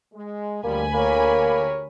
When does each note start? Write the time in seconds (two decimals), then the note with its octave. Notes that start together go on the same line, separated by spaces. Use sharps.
0.14 G#3
0.64 D2 C#3 F3 G3 A#3 G#5 B5
0.94 A#3 G4 A#4 C#5